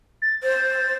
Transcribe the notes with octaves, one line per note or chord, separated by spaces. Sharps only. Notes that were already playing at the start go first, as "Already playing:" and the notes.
A6
C5